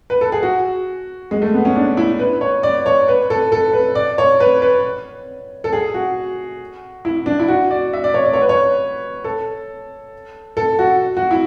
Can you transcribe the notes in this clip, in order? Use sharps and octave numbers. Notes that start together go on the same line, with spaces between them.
B4
A4
G#4
F#4
G#3
A3
B3
C#4
D4
E4
B4
C#5
D5
C#5
B4
A4
A4
B4
D5
C#5
B4
B4
A4
G#4
F#4
E4
D4
E4
F#4
D5
E5
D5
C#5
D5
C#5
B4
C#5
A4
A4
F#4
F#4
E4